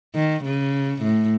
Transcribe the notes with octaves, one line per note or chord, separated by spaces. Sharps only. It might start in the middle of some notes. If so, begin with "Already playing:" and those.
D#3
C#3
A2